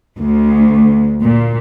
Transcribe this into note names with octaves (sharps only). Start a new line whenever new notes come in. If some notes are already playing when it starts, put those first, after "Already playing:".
D2
A#2